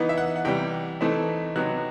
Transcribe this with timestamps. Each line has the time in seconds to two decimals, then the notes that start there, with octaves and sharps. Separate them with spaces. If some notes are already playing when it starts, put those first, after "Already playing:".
Already playing: E3 B3 D#4
0.09 E5
0.18 F#5
0.36 F#5
0.45 C3 E3 G3 G5
1.01 E3 A3 C4 D#4
1.56 C3 F#3 B3 D#4 F#6